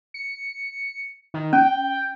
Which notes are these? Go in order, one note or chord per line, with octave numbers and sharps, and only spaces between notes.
C#7
D#3
C#4 G5